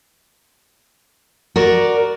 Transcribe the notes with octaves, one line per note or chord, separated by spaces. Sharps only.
F#4 A#4 D5